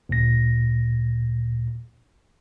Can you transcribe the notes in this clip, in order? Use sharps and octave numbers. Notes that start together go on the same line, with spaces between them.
D2 A#2 A#6